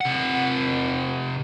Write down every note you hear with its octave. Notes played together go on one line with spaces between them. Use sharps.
C3 F#5